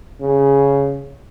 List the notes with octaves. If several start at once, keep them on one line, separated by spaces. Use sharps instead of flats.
C#3